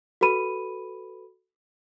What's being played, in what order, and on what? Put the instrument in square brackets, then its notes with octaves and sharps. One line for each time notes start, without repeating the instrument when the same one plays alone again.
[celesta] F#4 A4 B4 B5 D#7